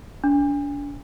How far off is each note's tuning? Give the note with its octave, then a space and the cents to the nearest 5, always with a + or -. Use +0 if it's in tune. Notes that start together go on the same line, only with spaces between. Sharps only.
D4 -35